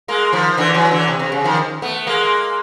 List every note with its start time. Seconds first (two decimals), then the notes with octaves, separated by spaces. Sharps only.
0.08 G#3 A#3
0.33 D#3 F3
0.57 D3 E3
0.74 E3 F#3
0.91 D3 E3
1.08 C3
1.19 C3
1.32 C#3
1.44 D#3 F3
1.82 A3 B3
2.07 G#3 A#3